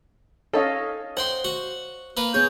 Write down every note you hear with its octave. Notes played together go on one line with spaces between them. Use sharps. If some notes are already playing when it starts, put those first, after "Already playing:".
C#4 D#4 A4 C#5 D#5 F5
C5 F#5 G5 C6
F#4 F#5
A#3 A#4 B4
B3 G#4 C#5 G6